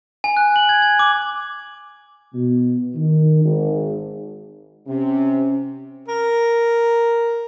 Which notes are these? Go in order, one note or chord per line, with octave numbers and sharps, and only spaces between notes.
G#5
F#6
F#7
G#6
G#6
D6
B2
D#3
G#1
C3 C#4
A#4